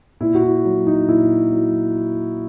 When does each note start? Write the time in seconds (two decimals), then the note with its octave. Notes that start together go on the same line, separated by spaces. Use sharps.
0.21 A#2 E4
0.35 F#4
0.42 E4
0.65 F#3
0.87 D#4
1.08 A#2 E4
1.52 F#3